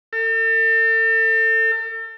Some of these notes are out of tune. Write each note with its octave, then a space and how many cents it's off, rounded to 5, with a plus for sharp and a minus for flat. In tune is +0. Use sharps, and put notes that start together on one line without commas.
A4 +40